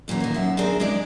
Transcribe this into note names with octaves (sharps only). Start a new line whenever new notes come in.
F#2 A#2 D3 E3
D#3 A#3
F#2 E5
C4 D4 G#4 A#4 C5
G#3 D4 E4 D5